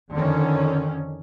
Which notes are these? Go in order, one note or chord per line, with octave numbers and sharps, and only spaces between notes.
F2 D3 D#3 C#4